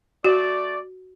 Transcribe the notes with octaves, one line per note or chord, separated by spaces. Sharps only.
A3 F#4 D5